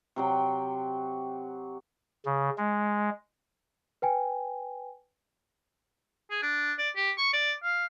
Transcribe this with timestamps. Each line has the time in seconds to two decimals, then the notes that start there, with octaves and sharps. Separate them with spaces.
0.16 C3 F#3 G5
2.25 C#3
2.58 G#3
4.02 B4 G5 G#5
6.30 G#4
6.42 D4
6.78 D5
6.96 G4
7.18 C#6
7.33 D5
7.63 F5